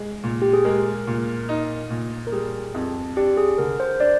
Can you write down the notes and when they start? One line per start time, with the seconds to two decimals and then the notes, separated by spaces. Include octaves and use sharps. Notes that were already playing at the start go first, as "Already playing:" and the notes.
Already playing: G#3
0.24 A#2
0.42 G4
0.53 G#4
0.65 G#3 A#4
1.07 A#2
1.49 D#4
1.90 A#2
2.27 A#4
2.32 G3 G#4
2.75 F2
3.16 D4 G4
3.37 G#4
3.58 D3 A#4
3.80 C5
4.00 D4 D5